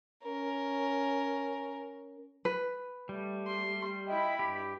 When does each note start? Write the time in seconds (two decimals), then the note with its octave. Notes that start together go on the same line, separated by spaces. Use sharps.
0.24 C#4 A#4
2.45 B4
3.09 G3 A3
3.47 C6
4.08 E4 D#5 E5 G5 B5
4.39 G2 G4